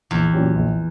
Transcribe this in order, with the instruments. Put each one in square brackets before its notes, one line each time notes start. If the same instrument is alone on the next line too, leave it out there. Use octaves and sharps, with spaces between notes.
[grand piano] A#1 [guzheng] E2
[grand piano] A#2 F#3 C#4 G4
A#1